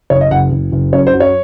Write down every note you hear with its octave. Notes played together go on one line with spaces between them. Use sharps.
F#1 C#5
D#5
F#1 F#5
F#1
F#1
F#2 C#5
C5
F#3
C#5